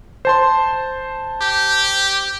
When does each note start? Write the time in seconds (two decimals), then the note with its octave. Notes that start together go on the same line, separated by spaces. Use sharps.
0.25 C5 A5 C6
1.41 G4